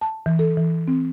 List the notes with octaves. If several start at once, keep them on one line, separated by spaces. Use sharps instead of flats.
A5
E3
A4
E3
C4